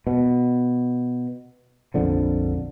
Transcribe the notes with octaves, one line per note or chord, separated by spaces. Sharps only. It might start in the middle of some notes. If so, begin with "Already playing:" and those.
B2
A#1 F2 D3 F3